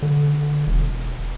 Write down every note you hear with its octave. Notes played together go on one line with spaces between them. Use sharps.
D3
E1